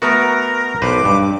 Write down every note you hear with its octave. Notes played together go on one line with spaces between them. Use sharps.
A3 B3 F#4 A#4
B1 B4 C5 D6
G2